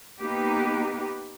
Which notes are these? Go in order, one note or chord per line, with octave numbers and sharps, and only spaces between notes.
A#3 B3 D#4 G4 B4